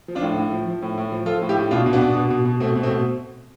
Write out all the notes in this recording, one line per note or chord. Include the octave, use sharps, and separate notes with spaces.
F3
D4 F4
A2
A2
F3
F3
A2
A2
F3
F3 F4 A4
A2
E4 G4
A2
B2 D4 F4
B2
B3 D4
B2
B2
B2
B2
B2 A3 C4
B2
A3 C4
B2